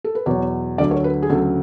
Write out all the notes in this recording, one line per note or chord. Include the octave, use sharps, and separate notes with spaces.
A4
B4
E2 B2 F#3 C#5
D2 D3 F#3 D5
C#5
B4
G#4
D2 C#3 F#3 A4